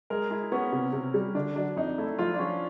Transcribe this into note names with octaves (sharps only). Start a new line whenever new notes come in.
G#3 A#4
G#3 E4
B3 C#4
C3
C3
G3
D3 D4
F#3 D4
F2 D#4
A3 E4
F3 F4
D4
F3 C#4